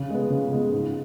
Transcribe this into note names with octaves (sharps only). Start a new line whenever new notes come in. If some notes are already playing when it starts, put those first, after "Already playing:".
Already playing: C#3
G#3 B3
C#3
G#3 B3
G#2